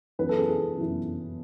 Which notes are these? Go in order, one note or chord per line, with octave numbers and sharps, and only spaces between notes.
F#2 E3 B3 E4 B4
A4
G#4
A4
F#2 E3 B3 E4